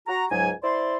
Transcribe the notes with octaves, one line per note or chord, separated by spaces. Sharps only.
F#4 A#5
C#2 G#2 F#3 G#5
E4 C5 D5 C6